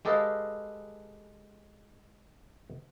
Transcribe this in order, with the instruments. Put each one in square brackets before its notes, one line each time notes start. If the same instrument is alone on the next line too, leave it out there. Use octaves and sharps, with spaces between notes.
[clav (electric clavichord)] G#3 G4 A4 B4 D#5 F5